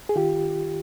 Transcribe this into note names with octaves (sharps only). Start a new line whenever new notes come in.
G#4
D#3 F4 G4